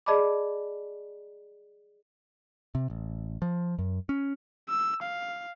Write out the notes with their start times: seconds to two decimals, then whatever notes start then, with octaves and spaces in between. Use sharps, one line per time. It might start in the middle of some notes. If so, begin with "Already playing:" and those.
0.06 G#4 D5 D#5 A5 B5 D6
2.75 C3
2.90 A1
3.42 F3
3.79 F#2
4.09 C#4
4.69 E6
5.02 F5